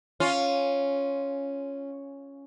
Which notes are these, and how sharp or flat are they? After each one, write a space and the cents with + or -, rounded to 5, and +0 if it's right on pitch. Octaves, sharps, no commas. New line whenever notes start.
C#4 +0 F4 +0